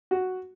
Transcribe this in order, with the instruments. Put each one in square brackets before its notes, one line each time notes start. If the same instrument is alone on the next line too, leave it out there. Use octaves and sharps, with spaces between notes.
[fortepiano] F#4